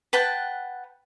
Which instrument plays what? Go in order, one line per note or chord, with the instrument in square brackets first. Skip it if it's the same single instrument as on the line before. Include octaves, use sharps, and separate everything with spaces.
[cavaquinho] B4 F#5 G5 A5